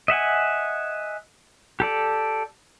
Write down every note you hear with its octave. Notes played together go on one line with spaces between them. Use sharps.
D#5 E5 F#5 G#5
G4 A4 D5